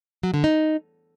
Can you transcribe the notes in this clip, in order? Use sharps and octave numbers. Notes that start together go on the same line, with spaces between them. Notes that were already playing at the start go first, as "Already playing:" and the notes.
F#3
D3
D#4